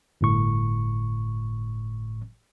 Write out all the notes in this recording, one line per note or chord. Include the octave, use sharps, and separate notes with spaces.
G1 A2 C#6